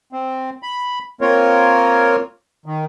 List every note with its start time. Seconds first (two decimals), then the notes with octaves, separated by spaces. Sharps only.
0.13 C4
0.63 B5
1.21 A#3 C4 F4 A#4 C#5
2.66 D#3